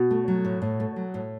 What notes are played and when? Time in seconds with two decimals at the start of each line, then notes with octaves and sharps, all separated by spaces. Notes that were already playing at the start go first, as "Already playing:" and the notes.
Already playing: B2
0.11 A3
0.28 F#3
0.45 A2
0.62 A2
0.80 A3
0.96 F#3
1.14 A2